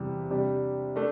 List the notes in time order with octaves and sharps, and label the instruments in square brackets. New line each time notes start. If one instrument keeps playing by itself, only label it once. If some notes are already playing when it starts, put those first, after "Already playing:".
Already playing: [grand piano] E2 C3 G3
C3 G3 D4
A3 D4